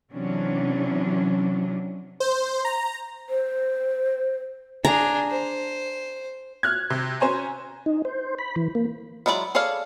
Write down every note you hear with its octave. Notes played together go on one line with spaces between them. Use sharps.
C3 E3 F#3 C#4 D4
C5
A#5
C5
D4 G#4 A#5
C5
F6 F#6 G#6
C3
C#4 C5 G#5 A#5
D#4
C5
B5
E3
A#3
F#3 G#3 E4 F#4 D5
G#4 A4 C#5 D5 F5